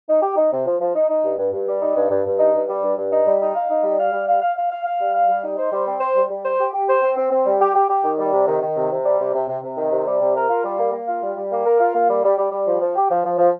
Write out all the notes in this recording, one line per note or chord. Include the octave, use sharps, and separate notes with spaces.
D#4
G4
D#4
C3
F3
F3
D#4
D#4
G2
G2
G2
G3
D#4
G2
G2
G2
D#4
G2
G3
G2
G2
D#4
G3
D#4
F5
D#4
G3
F5
G3
F5
F5
F5
F5
F5
G3
F5
G3
D#4
C5
G3
C4
C5
G3
G3
C5
G4
G4
C5
C4
C4
C4
G3
G4
G4
G4
D#3
G3
C3
D#3
D#3
C3
C3
G3
C3
C3
C3
C3
D#3
C3
G3
C3
A#4
F4
G3
A#3
A#3
F4
G3
G3
A#3
A#4
F4
A#3
G3
G3
G3
G3
F3
F3
G4
F3
F3
F3